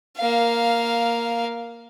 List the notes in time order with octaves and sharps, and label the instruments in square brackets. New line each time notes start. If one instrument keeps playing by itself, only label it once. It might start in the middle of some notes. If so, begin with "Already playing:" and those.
[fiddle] A#3 F5